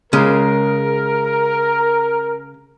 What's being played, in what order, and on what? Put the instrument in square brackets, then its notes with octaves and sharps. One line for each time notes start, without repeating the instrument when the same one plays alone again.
[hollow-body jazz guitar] C#3 G#3 [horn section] A#4